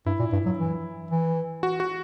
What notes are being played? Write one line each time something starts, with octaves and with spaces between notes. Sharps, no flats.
G2 E4
A#2
G2
F#3
E3
E3
F#4
F#4